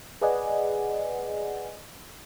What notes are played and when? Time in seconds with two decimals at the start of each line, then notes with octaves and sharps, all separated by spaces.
0.21 G#4 B4 D5 D#5 F#5 G#5